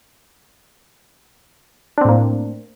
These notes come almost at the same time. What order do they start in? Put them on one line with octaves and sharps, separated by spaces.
D4 C4 A2 A#3